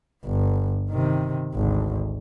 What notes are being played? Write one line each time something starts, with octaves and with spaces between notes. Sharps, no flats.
G1
C3 D#3
G#1 D2